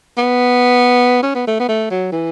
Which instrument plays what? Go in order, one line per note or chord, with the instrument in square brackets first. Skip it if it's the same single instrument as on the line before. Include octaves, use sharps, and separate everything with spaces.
[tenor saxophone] B3
C#4
B3
A3
B3
A3
F#3
E3